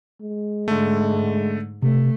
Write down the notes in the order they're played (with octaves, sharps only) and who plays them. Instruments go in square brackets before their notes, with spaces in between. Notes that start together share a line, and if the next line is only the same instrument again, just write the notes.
[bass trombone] G#3
[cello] G#2 [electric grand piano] D3 A3
[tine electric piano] C3 [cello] A3